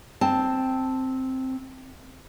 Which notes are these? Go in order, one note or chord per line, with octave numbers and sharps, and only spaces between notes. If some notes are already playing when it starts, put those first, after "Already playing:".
C4 A5